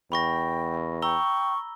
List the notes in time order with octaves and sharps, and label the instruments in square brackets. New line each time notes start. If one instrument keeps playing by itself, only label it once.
[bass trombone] E2 [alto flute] G5 [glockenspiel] B5 C#6 A#6
[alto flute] G5 [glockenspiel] A#5 E6 G7 [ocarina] C#6